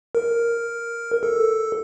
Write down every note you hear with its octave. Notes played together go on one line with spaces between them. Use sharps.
A#4
A4